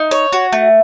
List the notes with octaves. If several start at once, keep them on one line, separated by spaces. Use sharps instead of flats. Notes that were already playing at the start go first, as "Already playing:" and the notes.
Already playing: D#4
C#5
F#4
A3